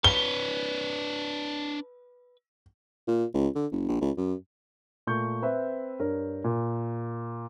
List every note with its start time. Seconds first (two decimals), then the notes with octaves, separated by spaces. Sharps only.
0.04 D4 B4 C#5 G7
3.08 A#2
3.34 C#2
3.55 D3
3.72 F#1
3.88 A#1
4.01 C#2
4.17 F#2
5.07 A#2 A3 C#6 G6
5.42 C4 B4 E5
6.00 G2 A#4 C#5
6.44 A#2